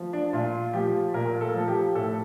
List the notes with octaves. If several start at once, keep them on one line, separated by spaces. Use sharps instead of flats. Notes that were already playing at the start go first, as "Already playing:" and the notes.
Already playing: F3
D4
A#2 F4
F3 G4
A#2 A#4
A4
F3
G4
A2 A4